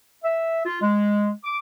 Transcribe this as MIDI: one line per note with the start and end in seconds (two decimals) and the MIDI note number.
0.24 0.61 76
0.66 0.79 65
0.81 1.30 56
1.44 1.57 86